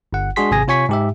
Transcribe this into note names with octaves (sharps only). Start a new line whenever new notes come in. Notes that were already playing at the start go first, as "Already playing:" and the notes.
G1 F#5
G#3 D4 F#4 G#4 C6 B6
G#1 C3 G#4 G#5 A#6
C3 F4 C#5 G#5 C#6 B6
G#2 G4 E5